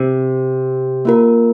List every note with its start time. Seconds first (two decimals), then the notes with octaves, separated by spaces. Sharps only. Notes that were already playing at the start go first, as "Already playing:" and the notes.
Already playing: C3
1.05 A#3 F4 A#4